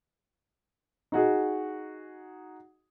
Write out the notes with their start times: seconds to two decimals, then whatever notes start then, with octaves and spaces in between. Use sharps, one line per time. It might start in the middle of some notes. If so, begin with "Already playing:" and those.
1.12 D#4 F#4 G#4